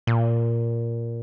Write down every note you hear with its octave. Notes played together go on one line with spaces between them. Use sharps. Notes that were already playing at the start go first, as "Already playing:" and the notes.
A#2